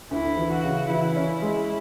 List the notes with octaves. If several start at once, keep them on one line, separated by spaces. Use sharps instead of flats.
D2 E4
E3
F#4
C#3
E3 E4
C#4
G#3